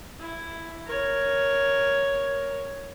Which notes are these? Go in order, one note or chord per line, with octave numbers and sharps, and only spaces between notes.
E4
A#4 C#5